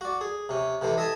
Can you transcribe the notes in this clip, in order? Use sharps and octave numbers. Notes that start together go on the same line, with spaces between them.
F#4 D5
G#4
C3 C#4
C3 E3 A3 C4
D#5 E5 G#5 A5